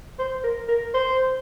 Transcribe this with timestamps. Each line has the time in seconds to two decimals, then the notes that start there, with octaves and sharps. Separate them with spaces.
0.19 C5
0.44 A#4
0.69 A#4
0.94 C5